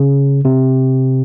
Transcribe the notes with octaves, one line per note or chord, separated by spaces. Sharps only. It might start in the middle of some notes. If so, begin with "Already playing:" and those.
Already playing: C#3
C3